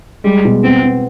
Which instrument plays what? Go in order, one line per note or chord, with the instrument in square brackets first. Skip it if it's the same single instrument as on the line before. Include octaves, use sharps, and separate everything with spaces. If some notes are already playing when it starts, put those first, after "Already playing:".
[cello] G3 [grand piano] G#3
[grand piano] B2
[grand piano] B3 [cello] C4
[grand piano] B3